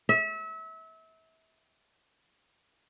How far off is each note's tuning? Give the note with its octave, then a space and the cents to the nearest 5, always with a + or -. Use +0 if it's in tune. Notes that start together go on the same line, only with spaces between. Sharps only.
E5 -30